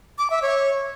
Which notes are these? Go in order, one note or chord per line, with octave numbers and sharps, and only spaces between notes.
D6
E5
C#5